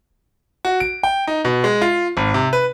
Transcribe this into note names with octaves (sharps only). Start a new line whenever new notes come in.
F#4
D7
G5
D#4
B2
G#3
F4
G#1
C3
B4